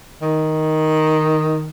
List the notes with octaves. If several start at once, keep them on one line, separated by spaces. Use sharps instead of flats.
D#3